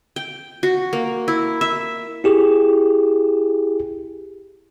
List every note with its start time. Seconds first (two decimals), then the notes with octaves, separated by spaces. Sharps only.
0.16 G5
0.63 F#4
0.93 A#3
1.28 E4
1.61 E5
2.24 E4 G4 G#4